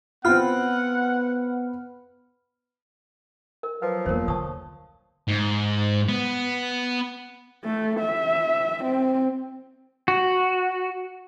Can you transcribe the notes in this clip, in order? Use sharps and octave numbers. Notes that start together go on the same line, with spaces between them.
B3 C4 F4 F#5 B5 F6
A#4
F3 F#3 B4
E2 A#3 A#4 C5
D3 A5 C#6 D#6
G#2
B3
A3
E5
C4
F#4